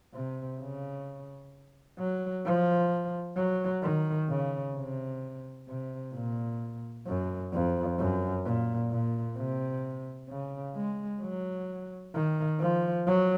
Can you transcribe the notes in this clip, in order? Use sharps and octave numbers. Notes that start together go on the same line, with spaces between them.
C3
C#3
F#3
F3
F#3
D#3
C#3
C3
C3
A#2
F#2
F2
F#2
A#2
A#2
C3
C#3
G#3
F#3
D#3
F3
F#3